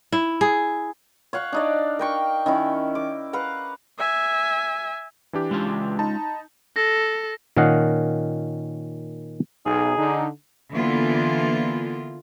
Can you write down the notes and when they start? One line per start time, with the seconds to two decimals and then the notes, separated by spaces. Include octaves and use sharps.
0.12 E4
0.41 G#4
1.33 C#5 F5 F#5 C#6
1.53 D4 D#4 D5
1.99 A#4 G5 C#6
2.46 D#3 C#4 E4
2.95 D6
3.33 B4 F5 F#5 A#5
3.98 E5 G#5
5.33 E3 D4 G4
5.51 G#3 C#4 F4
5.99 D#4 A5 B5
6.76 A4 A#6
7.57 A#2 D#3 C#4 D#5 F5 F#5
9.66 B1 D#4 G#4
9.97 D3 D#4
10.72 D3 E3 A#3 B3 F4